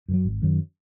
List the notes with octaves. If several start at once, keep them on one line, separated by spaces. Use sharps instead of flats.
F#2 D#3 F#3
G#1
F#2 D#3 F#3